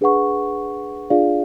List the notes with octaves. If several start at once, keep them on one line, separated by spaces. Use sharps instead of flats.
D4 G#4 B4 F#5 C#6
D4 F4 G#4 D5 F5